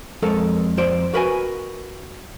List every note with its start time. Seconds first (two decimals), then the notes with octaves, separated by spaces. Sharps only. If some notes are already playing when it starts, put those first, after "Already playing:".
0.22 F2 G#3 A4 A#4 C#5
0.77 F2 C5 D5
1.13 F#4 A#4 B4 D#5 G#5